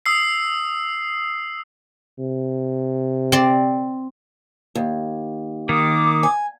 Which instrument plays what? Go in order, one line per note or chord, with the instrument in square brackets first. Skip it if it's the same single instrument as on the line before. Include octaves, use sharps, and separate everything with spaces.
[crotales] D#6 E6 C7
[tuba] C3
[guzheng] C4 D5
[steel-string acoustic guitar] D#2
[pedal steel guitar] D#3 A#3 [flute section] D6 D#6
[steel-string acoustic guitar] G#5